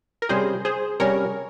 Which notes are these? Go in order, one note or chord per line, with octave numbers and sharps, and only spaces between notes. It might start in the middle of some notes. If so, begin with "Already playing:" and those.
A#4
C3 G3 C#4 G#4 C5
G#4 C5
C3 G3 C#4 A#4 C#5